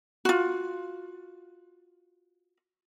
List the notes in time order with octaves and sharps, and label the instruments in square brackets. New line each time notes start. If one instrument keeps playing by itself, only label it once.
[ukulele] F4 F#4